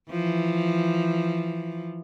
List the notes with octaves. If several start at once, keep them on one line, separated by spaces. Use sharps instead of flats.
E3 F3